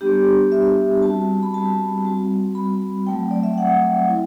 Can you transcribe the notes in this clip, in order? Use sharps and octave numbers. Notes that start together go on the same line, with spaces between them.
G3 B3 D4 G4
E5
G3 C4 F#4 A5
B5
A5
G3 C4 F#4
B5
F#3 A3 C4 G5
D5
E5
F#5
C4 E4